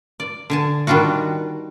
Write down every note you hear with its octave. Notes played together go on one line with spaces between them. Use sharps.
D5
D3 G#5 A5
D#3 G3 D4 F4 F#4